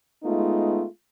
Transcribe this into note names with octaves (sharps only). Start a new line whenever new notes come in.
G#3 A3 B3 D#4 F4